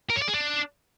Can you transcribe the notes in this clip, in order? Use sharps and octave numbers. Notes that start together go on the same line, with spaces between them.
A#4
C#5
D5
G#4
D4